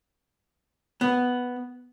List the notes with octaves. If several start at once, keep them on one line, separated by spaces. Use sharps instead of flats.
B3